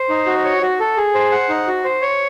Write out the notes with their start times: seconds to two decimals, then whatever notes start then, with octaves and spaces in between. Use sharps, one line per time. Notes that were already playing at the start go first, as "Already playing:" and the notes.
Already playing: C5
0.09 D#4
0.26 F#4
0.44 C#5
0.62 F#4
0.80 A4
0.97 G#4
1.14 C5
1.32 F#5
1.49 D#4
1.67 F#4
1.84 C5
2.02 C#5